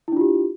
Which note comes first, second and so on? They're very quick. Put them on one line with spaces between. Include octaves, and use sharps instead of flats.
E4 D4 F4 G4